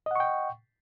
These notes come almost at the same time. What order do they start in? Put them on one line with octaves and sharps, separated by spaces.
D#5 F#5 C#6 G5